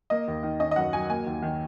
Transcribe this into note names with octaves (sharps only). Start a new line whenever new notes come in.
A#3 D#5
D#2
D#3
C#4 D#5
D#5
F#2 F#5
F#3 G#5
A#3 G#5
D#2
D#3